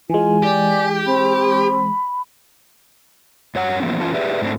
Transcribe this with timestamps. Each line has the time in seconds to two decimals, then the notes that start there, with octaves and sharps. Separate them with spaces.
0.10 E3 G#3 F4 G#5
0.43 G4 D5
1.06 C4 B5
3.55 G2 C#5 F#5
3.80 E3 F3 A#3 B3 C#4
4.01 E3 A3 C#4 F4 A5
4.14 G4 G#4 B4 D5 E5
4.41 G#2 A3 C4 D4